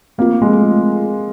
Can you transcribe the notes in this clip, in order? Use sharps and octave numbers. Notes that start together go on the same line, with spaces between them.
A3 A#3 C4 F4
G#3
A3 C4 F4